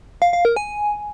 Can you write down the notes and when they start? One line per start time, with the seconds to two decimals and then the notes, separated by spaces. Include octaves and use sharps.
0.22 F5
0.33 F5
0.45 A#4
0.56 G#5